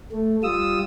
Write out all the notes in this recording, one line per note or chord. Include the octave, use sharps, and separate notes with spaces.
A3
G3 F4 D#6 E6